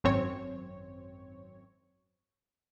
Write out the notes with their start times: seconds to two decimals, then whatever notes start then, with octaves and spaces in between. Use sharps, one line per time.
0.04 G#1 F#2 C4 C#5